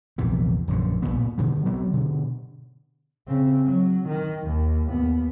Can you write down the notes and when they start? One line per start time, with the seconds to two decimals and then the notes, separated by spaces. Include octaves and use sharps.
0.18 A#1 E2 C3 E3
0.68 A#1 F#2 D3 F3
1.02 F#1 F#2 A#2 B3
1.38 B2 D3 D#3
1.66 F#3 B3 C4
1.93 B2 D3
3.28 C#3 C4
3.65 F#3
4.08 D#3
4.46 D#2
4.88 D#2 B3